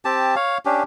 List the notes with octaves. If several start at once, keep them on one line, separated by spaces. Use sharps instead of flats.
C4 G4 A5
C#5 F5
C#4 D4 G4